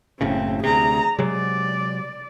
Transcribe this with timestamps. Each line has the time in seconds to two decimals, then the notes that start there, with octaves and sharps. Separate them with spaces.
0.21 F#1 A2 C#3 C4
0.64 D2 C3 G#4 A#5
1.19 C3 F#3 G#3 D5